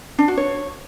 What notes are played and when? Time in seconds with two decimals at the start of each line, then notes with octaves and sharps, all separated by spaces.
0.19 D4
0.28 F#4
0.37 C#5